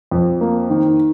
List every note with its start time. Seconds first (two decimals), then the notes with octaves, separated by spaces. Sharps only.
0.11 F2
0.41 A#3
0.70 D#3